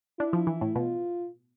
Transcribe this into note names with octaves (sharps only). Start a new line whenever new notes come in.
D4 E4
F3
E3
A2
B2 F4